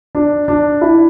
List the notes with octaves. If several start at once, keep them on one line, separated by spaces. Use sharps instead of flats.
D4
D4
E4